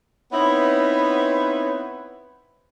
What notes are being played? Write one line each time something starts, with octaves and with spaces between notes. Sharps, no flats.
B3 C4 D#4 E4 B4 C#5